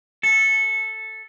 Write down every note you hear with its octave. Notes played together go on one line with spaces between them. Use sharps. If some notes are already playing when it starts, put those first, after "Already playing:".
A4